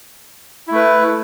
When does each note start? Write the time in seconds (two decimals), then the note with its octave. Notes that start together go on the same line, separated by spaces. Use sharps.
0.68 E4
0.71 A3
0.75 B4